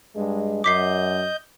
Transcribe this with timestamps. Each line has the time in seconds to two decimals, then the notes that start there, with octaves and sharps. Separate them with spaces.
0.16 G2 G#3
0.64 F#2 D#5 D6 G6 B6 C7